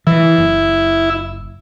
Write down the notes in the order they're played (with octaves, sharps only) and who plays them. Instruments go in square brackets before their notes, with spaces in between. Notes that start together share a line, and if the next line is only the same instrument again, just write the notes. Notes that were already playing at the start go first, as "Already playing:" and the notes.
[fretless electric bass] E3 [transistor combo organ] E4
[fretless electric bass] F#1